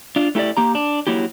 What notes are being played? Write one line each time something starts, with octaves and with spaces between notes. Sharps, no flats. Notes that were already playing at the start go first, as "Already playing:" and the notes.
D4 F4
A3 E4 G4 A4 D5
A#3 G4 A#5
D4
F#3 A#3 E4 G4